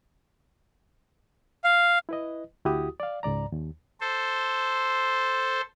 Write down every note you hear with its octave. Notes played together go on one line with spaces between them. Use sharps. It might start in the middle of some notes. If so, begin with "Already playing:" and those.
F5
E4 B4 D#5
D2 E4 F#4 G4 D#6
D5 F5
C#2 G#2 D5 A#5
D#2
A4 C5